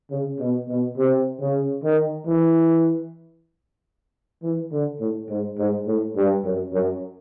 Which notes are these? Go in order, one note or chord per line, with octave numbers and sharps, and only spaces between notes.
C#3
B2
B2
C3
C#3
D#3
E3
E3
D3
A2
G#2
G#2
A2
G2
F#2
F#2